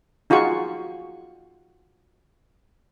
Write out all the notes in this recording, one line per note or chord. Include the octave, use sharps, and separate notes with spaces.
D#4 F4 F#4 G#4 C#6